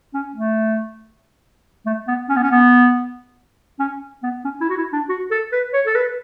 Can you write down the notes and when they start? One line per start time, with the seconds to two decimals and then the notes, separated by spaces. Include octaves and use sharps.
0.14 C#4
0.35 A3
1.86 A3
2.08 B3
2.29 C#4
2.36 B3
2.43 C#4
2.51 B3
3.79 C#4
4.23 B3
4.44 C#4
4.61 E4
4.69 F#4
4.77 E4
4.93 D4
5.09 F#4
5.31 A4
5.52 B4
5.73 C#5
5.86 A4
5.95 B4